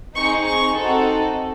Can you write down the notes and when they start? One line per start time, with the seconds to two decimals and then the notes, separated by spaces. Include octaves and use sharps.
0.16 C4 D#4 G#4 C#6
0.46 C#6
0.75 C4 D#4 F#4 A4